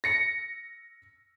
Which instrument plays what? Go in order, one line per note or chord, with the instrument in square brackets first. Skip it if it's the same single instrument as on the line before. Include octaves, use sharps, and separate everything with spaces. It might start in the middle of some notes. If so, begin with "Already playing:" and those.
[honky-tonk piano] A#6 C#7